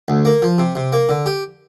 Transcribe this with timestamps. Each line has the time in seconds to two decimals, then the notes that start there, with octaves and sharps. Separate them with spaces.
0.08 D2
0.25 A#3
0.42 F3
0.58 C3
0.75 C3
0.93 A#3
1.09 D3
1.26 G4